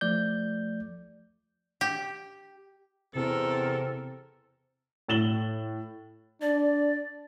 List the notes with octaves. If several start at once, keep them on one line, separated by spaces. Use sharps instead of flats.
F3 A3 D5 G6
G4
E2 C3 C4 A4 A#4
A2 A6 E7 F#7 G7
D4 D5